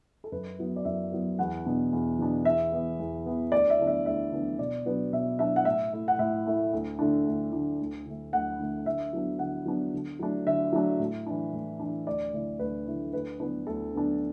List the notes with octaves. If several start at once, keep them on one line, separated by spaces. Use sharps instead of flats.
A4
F#2 B4
F#3 B3 E4
D5
F#2 E5
F#3 B3 E4
E2 F#5
B2 B3 D4
E2
B2 B3 D4
E2 E5
E3 B3
E2
E3 B3
D2 D5
E5
D3 B3 D4
E5
D2 E5
D3 B3 D4
B2 D5
F#3 B3 D4 B4
B2 E5
F#3 B3 D4 E5
F#5
A2 E5
A3 E4
F#5
A2 E5
A3 E4
D2
D3 A3 D4
D2
D3 A3 D4
D2
D3 A3
D2 F#5
D3 A3
D3 E5
F#3 B3 D4
D3 F#5
F#3 B3 D4
D3
F#3 A3 D4
D3 E5
F#3 A3 D4
A2
E3 D4
A2
E3 D4
D2 D5
D3 A3 E4
D2 B4
D3 A3 E4
D2 B4
D3 B3 D4 B4
D2 A4
D3 B3 D4